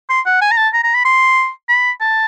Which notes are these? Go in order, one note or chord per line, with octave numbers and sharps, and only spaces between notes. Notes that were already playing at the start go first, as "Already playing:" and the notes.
C6
F#5
G#5
A#5
A5
A#5
A#5
B5
C6
B5
A5